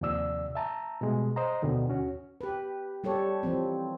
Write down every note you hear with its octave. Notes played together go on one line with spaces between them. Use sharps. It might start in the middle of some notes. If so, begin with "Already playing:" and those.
D#2 C3 F3 D5 E6
E5 A5 A#5
B2 G3 G#3
C5 D#5 A#5
D2 B2 D3 D#3
D#2 C#4 F#4
G4 B4
G3 G4 A4 C#5
E3 F3 C4